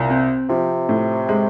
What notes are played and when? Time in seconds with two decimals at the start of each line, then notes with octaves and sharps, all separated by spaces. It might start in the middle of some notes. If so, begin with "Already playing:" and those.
Already playing: C2 A#2
0.10 C4
0.49 C3 F3
0.89 A2
1.29 G#3